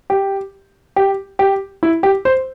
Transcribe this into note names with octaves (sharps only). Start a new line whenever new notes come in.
G4
G4
G4
E4
G4
C5